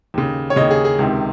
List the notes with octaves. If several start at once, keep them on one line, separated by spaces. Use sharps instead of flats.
D#2 C#3
C#5
D#2 C#3 D#5
G#4
G#4
C#2 C3 D#3